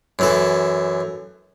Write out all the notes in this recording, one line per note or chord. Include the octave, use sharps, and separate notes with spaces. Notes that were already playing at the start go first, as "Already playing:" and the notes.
F#2 E3 A4